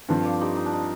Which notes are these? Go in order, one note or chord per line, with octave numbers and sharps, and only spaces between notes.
G2 F3 C4 A4 C5
D5 F5
D#4 G4
D#4
D4
D#4